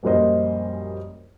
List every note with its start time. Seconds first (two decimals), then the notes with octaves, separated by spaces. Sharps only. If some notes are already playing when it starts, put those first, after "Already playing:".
0.03 A#1 F#2 G3 A#4 C5 D#5